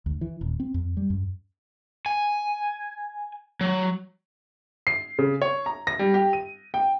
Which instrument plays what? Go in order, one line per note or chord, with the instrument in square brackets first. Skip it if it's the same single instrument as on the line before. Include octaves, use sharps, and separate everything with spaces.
[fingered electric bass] D2
E3
D#1
C4
F2
G3
F#2
[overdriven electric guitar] G#5
F#3
[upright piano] C7
C#3
C#5
A#5
A#6
G3
G4
D#7
G5